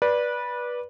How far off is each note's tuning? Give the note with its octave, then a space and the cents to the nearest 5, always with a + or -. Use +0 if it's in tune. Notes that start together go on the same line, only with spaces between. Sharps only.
B4 -20 D5 +0